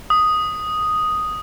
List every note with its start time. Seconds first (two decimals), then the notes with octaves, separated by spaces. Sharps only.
0.10 D#6